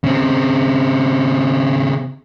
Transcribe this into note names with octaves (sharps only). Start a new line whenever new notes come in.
C#3 C4